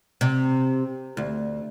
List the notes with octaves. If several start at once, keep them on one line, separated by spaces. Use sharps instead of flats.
C3
D2